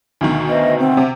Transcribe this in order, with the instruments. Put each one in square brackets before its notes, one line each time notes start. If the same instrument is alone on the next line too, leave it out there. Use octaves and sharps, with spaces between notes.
[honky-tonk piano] D2 B2 D#3 [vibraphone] B3
[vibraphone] B4 C5 E5 [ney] D#5
[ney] C4 [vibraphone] C5 E5 F#5
[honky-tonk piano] C3